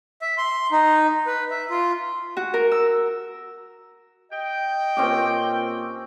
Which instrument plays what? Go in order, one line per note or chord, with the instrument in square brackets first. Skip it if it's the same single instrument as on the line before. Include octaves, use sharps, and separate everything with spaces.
[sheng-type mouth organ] E5
C6
D#4
B4
E5
F4
[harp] F#4
A#4
E6
[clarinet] D#5 [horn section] G5
[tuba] A#2 [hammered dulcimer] C4 C#4 G4